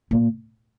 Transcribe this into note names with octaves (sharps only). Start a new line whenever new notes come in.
A#2